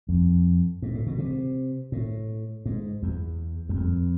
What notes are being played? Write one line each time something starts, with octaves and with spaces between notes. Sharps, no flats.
F2
G#2
A2
B2
C3
A2
G#2
E2
E2
F2